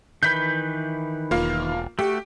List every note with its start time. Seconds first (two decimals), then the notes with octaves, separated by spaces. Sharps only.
0.23 D#3 E3 B4 G6 B6
1.31 E1 A#3 F4
1.99 A3 F#4 G4